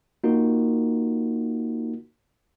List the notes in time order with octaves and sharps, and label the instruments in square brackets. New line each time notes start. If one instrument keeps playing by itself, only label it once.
[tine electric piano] A#3 D#4 F4 F#4 A#4